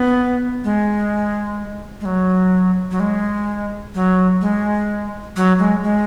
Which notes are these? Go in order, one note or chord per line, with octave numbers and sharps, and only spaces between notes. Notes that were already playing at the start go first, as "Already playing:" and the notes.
Already playing: B3
G#3
G#3
F#3
F#3
G#3
F#3
G#3
F#3
G#3
G#3